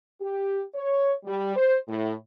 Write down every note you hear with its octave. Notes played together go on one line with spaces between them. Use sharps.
G4
C#5
G3
C5
A2